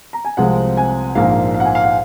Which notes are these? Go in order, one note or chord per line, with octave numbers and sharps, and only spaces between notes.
A#5
G#5
C2 C3 F3 G#3 C4 F#5
G#5
A#1 G#2 F3 A#3 F5
F5
F#5
G#5
F5
F#5